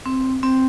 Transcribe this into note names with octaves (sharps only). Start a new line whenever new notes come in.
C4
C4